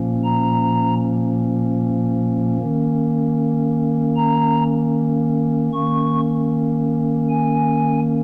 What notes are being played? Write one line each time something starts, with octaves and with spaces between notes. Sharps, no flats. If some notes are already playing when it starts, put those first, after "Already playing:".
Already playing: A#2 F3 A#3 C#4
A#5
D#3 A#3 C#4
A#5
D#3 A#3 C#4 C#6
G#5